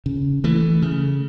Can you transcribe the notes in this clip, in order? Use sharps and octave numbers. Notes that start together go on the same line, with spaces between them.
C#3
E3 A3
C#3